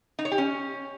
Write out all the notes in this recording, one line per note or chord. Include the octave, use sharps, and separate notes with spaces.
D#4
C#5
G4
C#4